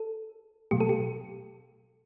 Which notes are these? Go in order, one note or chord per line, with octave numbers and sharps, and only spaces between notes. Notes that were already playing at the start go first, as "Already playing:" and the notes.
Already playing: A4
B2 F#3 A3 G4
A4
G4